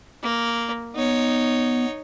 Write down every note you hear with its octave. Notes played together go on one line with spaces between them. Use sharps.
A#3
B3 D#4 C#5